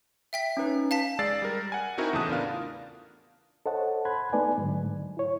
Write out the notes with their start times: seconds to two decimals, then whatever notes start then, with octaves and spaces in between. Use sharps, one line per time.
0.33 E5 G5 B6
0.57 C#4 D#4 B4
0.91 F5 A5 B6
1.19 G#3 D5 E6 A6 C7
1.42 G3 A#4
1.72 F#5 G#5
1.98 C4 D#4 E4 F#4 A#4
2.13 E2 A2 C#3 A5 D#6 F#6
2.28 B3 D4 F4 A#4 F5
3.66 A4 C5 C#5 D#5 F#5 A5
4.05 A5 B5 C6 F#6 G#6
4.33 A3 B3 D#4 B4 D5 G#5
4.58 G#2 D3 F#3
5.17 E4 C#5